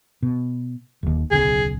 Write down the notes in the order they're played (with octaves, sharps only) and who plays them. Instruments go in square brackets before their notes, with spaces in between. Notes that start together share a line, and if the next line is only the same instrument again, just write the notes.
[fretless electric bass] B2
D#1 D#2
[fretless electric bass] D1 B1 C#3 [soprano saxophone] G#4